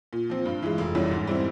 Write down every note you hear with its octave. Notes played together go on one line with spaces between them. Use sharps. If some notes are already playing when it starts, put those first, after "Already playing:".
A#2
F3 C4
G2
E3 G#3
F1
E2 E3 G3 C#4
G#2
G3 C4 E4